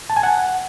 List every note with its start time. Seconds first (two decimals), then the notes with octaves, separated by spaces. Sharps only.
0.10 A5
0.16 G#5
0.23 F#5